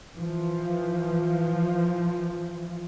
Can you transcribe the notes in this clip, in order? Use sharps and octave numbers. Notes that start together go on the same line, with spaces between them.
E3 F3